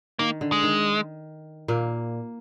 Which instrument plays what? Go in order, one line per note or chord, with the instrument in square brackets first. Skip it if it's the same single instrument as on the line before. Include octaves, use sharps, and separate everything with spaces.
[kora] D#3 [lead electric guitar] A#3
[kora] D3
[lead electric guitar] G#3
[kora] D#3
A#2 A#3